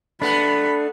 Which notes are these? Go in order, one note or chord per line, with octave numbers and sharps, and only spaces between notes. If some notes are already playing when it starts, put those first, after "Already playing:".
A3 B3 D4 B5